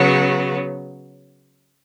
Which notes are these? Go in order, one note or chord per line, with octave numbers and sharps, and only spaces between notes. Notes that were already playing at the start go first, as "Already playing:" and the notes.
Already playing: C#3 F#3 B3